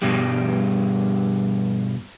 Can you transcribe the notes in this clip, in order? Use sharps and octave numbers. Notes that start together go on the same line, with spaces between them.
G2 B2 G3